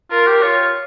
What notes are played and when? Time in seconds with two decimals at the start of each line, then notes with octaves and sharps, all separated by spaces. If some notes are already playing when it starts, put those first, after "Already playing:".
0.11 F4 A#4
0.26 G4
0.41 F4 C#5